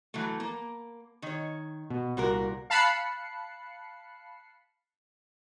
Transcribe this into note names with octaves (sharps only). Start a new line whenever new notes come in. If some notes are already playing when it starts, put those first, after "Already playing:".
E3 F#3 A3
A#3
D#3 C#5
B2
C2 A#2 F#4 A#4
F5 A5 B5 F#6 C7 C#7